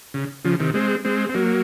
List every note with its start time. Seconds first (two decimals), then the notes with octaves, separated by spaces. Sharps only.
0.14 C#3
0.45 C#3 F3
0.60 C3 D#3
0.74 G#3 C4
1.05 G#3 C4
1.29 C4
1.35 F#3 A#3